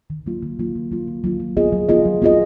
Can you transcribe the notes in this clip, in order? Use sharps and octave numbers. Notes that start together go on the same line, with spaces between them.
D#3
F#3 A#3 F4
D#3
F#3 A#3 F4
D#3
F#3 A#3 F4
D#3
F#3 A#3 F4
F#3
B3 F4 G#4 D#5
F#3
B3 F4 G#4 D#5
F#3
B3 F4 G#4 D#5